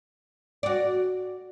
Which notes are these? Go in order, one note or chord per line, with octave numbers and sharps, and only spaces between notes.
F#4 D5